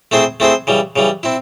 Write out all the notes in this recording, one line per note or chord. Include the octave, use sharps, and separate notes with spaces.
A3 C4 E4 G#4 C5
A3 C4 E4 G#4 C5
C#3 E3 G3
C#3 E3 G3
C4 E4